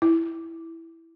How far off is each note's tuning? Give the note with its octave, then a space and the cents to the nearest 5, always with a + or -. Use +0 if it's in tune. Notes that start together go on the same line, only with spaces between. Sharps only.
E4 +0